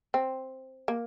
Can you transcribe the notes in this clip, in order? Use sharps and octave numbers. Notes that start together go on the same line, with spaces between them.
C4
A#3